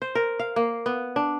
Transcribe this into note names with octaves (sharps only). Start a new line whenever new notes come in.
C5
A#4
F5
A#3
B3
D4